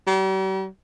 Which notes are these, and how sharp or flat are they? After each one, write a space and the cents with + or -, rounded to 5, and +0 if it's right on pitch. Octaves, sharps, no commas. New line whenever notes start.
G3 -45